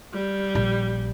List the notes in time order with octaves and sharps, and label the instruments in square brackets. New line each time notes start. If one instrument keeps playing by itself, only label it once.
[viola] G3
[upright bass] A#1